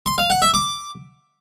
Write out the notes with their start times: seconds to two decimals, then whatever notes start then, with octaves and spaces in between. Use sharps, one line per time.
0.06 C6
0.18 F5
0.30 F#5
0.42 E5
0.54 D6